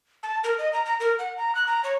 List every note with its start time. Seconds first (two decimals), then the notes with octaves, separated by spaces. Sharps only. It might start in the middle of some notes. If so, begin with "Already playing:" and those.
0.23 A5
0.44 A#4
0.58 D#5
0.73 A#5
0.85 A#5
1.00 A#4
1.19 F#5
1.38 A#5
1.55 F#6
1.67 A#5
1.84 C#5